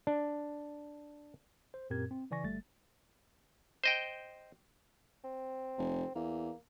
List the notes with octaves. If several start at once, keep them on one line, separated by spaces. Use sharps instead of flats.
D4
C5
F#2 A#2 C4 G4 A#4 G#6
C4
C#3 E3 D5 G#5 C#6 A#6
G1 G3 A3 A6
C5 D#5 G5
C4
F1
E2 A#3